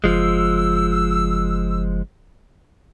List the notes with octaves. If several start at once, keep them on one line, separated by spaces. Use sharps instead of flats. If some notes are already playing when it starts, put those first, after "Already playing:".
F#1 F3 G#3 E6